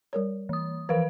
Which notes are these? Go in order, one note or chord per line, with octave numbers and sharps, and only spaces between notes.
G3 A#4 C#5
E3 D#6
E3 F3 A#4 B4 F5